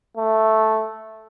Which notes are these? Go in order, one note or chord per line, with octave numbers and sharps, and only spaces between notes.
A3